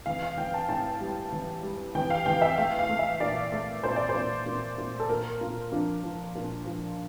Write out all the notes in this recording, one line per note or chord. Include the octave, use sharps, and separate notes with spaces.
E3 F5
F5
E3 G5
A5
A2 A5
G3
E3
G3
E3 G5
F5
E3 G5
E5
A3 F5
F5
A3
E5
A#2 D5
A3
A#2 C5
D5
C5
A#2
A#2
A#2
A4
A#2 A#4
A#2 F4
F3 D4
F3
A#2
F3